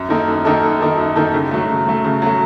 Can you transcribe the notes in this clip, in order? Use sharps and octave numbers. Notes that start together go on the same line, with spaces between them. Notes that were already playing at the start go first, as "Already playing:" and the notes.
Already playing: F#2
D#3 A#3 D#4 A4
F#2
D#3 A#3 D#4 A4
F#2
D#3 A#3 D#4 A4
F#2
D#3 A#3 D#4 A4
C#3
F#3 A3
C#3
F#3 A3
C#3
F#3 A3